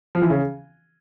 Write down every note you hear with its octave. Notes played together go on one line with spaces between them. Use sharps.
F3
E3
C#3